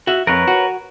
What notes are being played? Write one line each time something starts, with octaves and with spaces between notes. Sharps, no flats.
F#4 E5
F2 A#4 B4 C#5
F#4